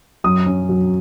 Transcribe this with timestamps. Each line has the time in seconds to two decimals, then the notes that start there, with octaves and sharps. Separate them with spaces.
0.24 F#2 D#6
0.46 C#4
0.69 F#3